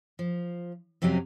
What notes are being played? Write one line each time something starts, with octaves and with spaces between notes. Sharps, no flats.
F3
F2 C3 F#3 C4 C#4